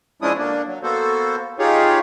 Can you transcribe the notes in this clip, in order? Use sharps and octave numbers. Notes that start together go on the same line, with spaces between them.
F3 G#3 C#4 D4 E4 D#6
D3 A#3 D4
F#3
A#3 B3 F#4 A4 C5
D#4 F4 G4 G#4 C#5